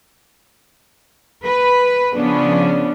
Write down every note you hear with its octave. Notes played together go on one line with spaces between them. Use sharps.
B4
C#3 F3 B3 C#4 D4